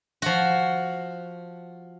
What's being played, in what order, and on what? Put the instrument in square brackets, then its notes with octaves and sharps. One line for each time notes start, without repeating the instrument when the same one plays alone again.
[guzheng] F3 F#4